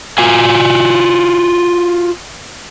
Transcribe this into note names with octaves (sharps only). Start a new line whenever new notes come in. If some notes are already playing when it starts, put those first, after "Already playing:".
F4 F#4 G#5